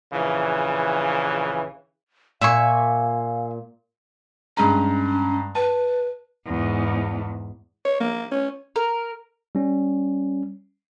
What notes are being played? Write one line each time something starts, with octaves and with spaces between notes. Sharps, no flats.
A#1 C#3 E3
A#2 E5 F5 G#5 C#6
G2 G#3 C#4 A#5
B4 A5
E2 G#2
C#5
A#3
C#4
A#4
G3 C#4